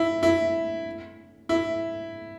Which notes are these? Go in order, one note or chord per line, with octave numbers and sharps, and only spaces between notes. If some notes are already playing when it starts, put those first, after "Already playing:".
Already playing: E4
E4
E4